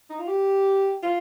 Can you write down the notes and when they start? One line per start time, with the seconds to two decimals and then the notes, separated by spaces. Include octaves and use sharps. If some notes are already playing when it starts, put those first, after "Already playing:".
0.10 D#4
0.19 F4
0.28 G4
1.03 F4